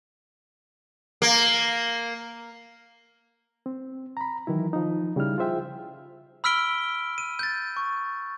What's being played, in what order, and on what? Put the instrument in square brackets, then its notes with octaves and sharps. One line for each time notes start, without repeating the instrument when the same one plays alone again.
[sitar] A#3
[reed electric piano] C4
A#5 B5
D#3 E3 F#3 E4
F3 D#4
C#3 G3 D#4 E4 F6
F4 G#4 C5 E5 G5
[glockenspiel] B5 E6 F6 B6 D7 G7
D#7
G6 A6
C#6